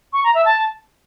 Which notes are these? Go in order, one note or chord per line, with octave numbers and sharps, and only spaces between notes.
C#6
A#5
E5
A5